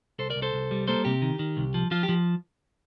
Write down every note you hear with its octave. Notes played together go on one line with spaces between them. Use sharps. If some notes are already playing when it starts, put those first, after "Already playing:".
C2 A4 C5
A#4 D5
C2
A4 C5
C2
G3
A#3 A4 C5
C3 G4
D#3
D#3
C2
F3
F3 F4
G4
F3